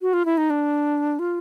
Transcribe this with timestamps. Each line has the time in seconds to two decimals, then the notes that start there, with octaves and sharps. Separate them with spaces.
0.01 F#4
0.13 F4
0.25 E4
0.37 D#4
0.50 D4
1.19 F4